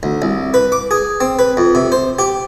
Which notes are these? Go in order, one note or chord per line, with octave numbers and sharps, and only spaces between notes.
D2
C2
B4
D6
G#4
C4
B4
F2
C3
C5
G4